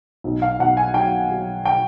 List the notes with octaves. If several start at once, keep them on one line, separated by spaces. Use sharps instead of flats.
B1
F5
B1 F#5
G#5
F#3 G5
F#3
G5